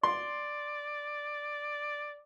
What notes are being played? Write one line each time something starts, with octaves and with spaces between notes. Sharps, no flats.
D5 C6